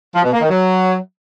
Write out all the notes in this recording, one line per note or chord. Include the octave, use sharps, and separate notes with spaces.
F3
B2
A#3
D#3
F#3